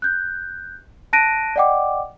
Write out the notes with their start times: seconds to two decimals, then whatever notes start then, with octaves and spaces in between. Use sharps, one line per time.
0.02 F#6 G6
1.13 A5 F#6 A#6 D7 D#7
1.56 D5 D#5 F#5 G5 D6